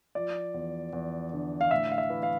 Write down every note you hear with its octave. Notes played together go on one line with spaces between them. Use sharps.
F3 D5
E2
E2
D3
F5
A2 E5
F5
E5
E3
F5